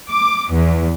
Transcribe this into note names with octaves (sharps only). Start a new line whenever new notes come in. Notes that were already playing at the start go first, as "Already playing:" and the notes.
D6
E2